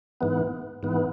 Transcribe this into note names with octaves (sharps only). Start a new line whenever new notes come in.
G#2 E3 B3
G#2 E3 B3